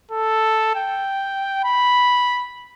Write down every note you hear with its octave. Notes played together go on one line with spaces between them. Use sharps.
A4
G5
B5